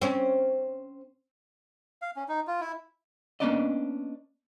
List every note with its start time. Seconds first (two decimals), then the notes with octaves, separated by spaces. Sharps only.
0.02 C4 C#4
2.02 F5
2.16 C#4
2.29 D#4
2.47 F4
2.61 E4
3.40 A#3 B3 C#4 D4 D5 D#5